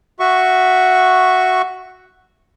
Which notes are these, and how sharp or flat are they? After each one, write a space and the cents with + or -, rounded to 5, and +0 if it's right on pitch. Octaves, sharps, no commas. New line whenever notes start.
F#4 +0 E5 +0 C#6 +0